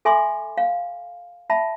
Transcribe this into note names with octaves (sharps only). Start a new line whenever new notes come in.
A4 E5 G#5 B5 C6 D6
F5
E5 F#5 A5 B5